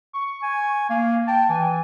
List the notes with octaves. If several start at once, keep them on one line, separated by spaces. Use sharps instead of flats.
C#6
G#5
A#3 F5
G5 A5
E3 G#5